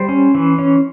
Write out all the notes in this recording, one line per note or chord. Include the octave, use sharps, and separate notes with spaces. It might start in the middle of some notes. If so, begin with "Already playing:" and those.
Already playing: G3 C5
C#4
E3
C#4